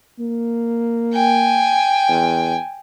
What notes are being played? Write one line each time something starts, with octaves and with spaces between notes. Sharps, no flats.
A#3
G5 G#5
E2